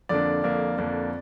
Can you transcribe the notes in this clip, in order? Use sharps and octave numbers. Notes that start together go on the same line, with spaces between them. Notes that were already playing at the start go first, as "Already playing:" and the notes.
F2 D3 A#3 D4 D5
F2 D3 A#3 D4
F2 D3 A#3 D4